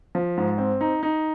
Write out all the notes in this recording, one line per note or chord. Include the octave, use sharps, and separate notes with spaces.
F3
G#2
C4
D#4
D#4